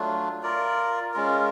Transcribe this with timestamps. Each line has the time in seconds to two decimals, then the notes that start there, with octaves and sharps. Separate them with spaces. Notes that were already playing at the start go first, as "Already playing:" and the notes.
Already playing: F#3 A3 D4 F4
0.43 F4 A#4 D5
1.14 G#3 C#4 F4 A#4